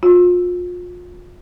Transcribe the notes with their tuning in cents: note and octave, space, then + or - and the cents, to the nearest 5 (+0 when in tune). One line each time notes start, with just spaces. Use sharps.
F4 +35